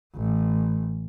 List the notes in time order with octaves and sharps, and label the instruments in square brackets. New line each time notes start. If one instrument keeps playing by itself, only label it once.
[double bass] A1